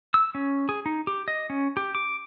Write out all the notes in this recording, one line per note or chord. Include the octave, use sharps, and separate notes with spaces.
E6
C#4
G#4
D#4
G4
D#5
C#4
G4
D6